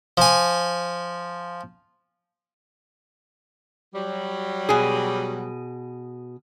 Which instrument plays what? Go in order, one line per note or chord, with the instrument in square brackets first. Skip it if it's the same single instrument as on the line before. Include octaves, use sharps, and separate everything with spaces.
[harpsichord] F3 G#5
[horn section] F#3 G3
[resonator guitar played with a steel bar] B2 G#4